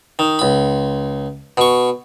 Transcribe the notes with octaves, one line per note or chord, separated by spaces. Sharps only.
D#3
C#2 B5
B2 C#6